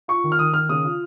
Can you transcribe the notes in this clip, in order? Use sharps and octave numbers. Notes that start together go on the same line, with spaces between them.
F4 C#6
D#3
F6
D#3 D#6
D#3 F6
C#3 D#6
F4